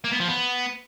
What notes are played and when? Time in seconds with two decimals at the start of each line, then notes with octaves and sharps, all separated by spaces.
0.04 A#3
0.12 B3
0.20 F3
0.28 B3